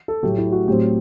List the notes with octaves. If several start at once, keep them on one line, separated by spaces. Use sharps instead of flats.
A4
A2 F#3 A3 G4
E4
F#4
A2 F#3 C4 G4